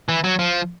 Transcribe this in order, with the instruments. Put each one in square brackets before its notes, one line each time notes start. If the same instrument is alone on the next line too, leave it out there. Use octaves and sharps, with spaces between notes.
[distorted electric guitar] E3
F#3
F3